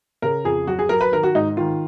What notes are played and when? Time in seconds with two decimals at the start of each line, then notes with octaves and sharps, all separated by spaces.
0.22 C#3 A#4
0.45 F2 G#4
0.67 F#3 F#4
0.79 G#4
0.89 F#3 A#4
1.01 B4
1.12 D#3 A#4
1.23 F#4
1.35 G#2 D#4
1.57 D#3 F4